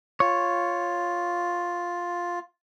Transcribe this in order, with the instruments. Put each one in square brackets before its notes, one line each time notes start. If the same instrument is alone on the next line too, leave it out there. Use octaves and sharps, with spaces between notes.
[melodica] F4 [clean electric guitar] C#5